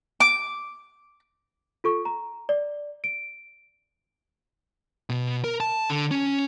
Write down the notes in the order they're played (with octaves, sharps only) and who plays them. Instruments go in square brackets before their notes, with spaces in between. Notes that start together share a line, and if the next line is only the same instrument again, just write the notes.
[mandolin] D6
[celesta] F4 A4 C#6
A#5
D5
D7
[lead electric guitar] B2
A#4
A5
D3
C#4